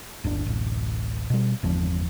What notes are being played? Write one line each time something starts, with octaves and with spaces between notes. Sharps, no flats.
D1 G1 D4
D1 A1
B2 G3
G1 E2 F3 C4